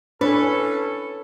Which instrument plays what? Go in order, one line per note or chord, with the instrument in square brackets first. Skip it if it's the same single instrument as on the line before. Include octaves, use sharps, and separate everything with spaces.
[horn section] E3 C#4 A4 [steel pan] D4 C#5 G#5 [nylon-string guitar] B4